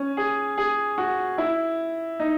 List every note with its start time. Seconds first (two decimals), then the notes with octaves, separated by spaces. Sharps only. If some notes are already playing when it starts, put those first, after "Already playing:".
Already playing: C#4
0.17 G#4
0.58 G#4
0.98 F#4
1.38 E4
2.20 D#4